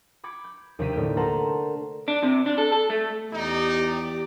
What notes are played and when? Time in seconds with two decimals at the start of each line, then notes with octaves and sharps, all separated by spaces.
0.24 B5 D6 G#6 C#7
0.44 G6
0.79 D#2 C3 G4 B6 D#7
0.93 A2 D3 A#3 G6
1.17 A4 A#4 C5 F#5 A5 A#5
2.08 D4
2.23 C3
2.46 D4
2.58 A4
2.72 A4
2.90 A3
3.33 E2 D#4 G4 D5